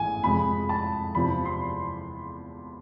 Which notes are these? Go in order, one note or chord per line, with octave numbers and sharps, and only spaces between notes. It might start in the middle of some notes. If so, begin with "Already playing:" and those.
Already playing: A1 G#2 E3 G#5
F2 C3 G#3 B5
A5
E2 C3 F3 B5
C6